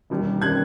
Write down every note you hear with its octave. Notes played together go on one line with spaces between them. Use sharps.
E1 D#2 D#3 G3
D#3 G3 F#6 G#6